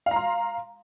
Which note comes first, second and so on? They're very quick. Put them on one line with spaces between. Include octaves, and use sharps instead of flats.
F5 A#5 C6